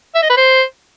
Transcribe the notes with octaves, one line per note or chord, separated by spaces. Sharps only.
E5
D#5
B4
C5